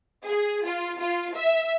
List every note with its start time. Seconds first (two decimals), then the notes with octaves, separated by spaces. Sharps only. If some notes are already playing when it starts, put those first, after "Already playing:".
0.24 G#4
0.63 F4
0.97 F4
1.34 E5